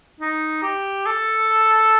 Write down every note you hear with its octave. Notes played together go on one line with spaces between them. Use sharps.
D#4
G4
A4